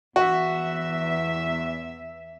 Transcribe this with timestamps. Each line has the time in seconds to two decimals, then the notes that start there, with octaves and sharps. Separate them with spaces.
0.16 E2 F#4 E5